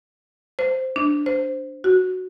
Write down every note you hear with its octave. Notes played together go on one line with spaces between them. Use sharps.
C5
D4
C5
F#4